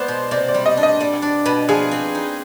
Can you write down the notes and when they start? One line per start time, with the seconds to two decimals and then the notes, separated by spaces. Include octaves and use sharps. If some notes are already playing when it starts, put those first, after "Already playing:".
Already playing: G#3 B3 C5 D5
0.08 B2
0.31 C3 D5
0.48 D5
0.54 G3
0.66 D#5
0.77 D4
0.83 D#5
1.00 G3 D5
1.22 D4
1.46 B2 B4
1.68 F3 G#4
1.91 C4
2.15 D#4